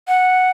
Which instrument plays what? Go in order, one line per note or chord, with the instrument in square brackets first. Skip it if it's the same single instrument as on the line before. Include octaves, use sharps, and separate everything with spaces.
[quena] F#5